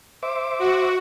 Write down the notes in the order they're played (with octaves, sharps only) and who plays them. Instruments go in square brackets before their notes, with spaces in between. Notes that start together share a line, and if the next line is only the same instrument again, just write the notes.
[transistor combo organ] C5 E5 D6
[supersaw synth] F#4